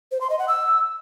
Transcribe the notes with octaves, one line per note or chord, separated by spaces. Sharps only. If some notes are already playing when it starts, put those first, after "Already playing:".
C5
C6
D#5
F#5
E6